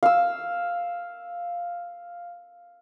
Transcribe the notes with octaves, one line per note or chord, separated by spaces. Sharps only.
F5 E6